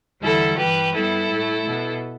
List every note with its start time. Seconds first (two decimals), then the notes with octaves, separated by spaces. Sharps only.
0.22 E2 D3 G3 E4 A4
0.58 G2 E3 G3 G4 B4
0.94 G2 G3 B3 E4 A4
1.30 A2 A3
1.66 B2 B3